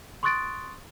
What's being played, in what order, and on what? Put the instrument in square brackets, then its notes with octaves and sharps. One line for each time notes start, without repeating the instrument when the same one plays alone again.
[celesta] C6 C#6 D#6 F#6 A6 D7